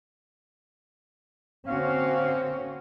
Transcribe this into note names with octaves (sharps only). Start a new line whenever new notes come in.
D3 A#3 C4 C#4 F#4 F5